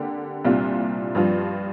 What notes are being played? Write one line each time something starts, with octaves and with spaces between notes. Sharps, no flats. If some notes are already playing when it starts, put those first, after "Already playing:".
Already playing: D3 A#3 G4
C2 A#2 G3 D4 F4
G2 F3 D4 F4